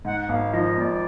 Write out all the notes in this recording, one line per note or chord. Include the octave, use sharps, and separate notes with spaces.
G#2 F#5
F#5
G#1 F5
F3 D#5
G#1 D5